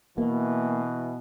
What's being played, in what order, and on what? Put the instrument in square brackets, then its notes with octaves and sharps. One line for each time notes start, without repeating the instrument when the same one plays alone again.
[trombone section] B2 E3 [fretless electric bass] A#3